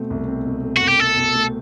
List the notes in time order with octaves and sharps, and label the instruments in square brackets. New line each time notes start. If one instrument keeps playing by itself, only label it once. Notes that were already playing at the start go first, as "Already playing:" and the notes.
Already playing: [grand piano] B2 A3 C4
C2
C4
B2
A3
[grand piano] C2 [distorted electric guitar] F#4
[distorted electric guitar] G4
[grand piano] C4 [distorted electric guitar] A4
[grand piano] B2
A3